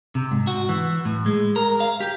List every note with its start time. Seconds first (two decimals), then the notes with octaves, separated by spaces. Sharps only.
0.15 C3
0.31 G#2
0.47 F#4
0.69 E3
1.05 A2
1.26 G#3
1.56 A#4
1.80 F5
2.00 G4